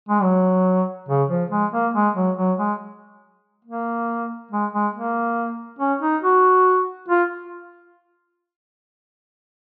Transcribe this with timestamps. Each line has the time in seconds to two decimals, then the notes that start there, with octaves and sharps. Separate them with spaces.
0.09 G#3
0.22 F#3
1.09 C#3
1.29 F3
1.51 G#3
1.72 A#3
1.94 G#3
2.15 F#3
2.37 F#3
2.58 G#3
3.65 A#3
4.51 G#3
4.73 G#3
4.94 A#3
5.79 C#4
6.02 D#4
6.22 F#4
7.08 F4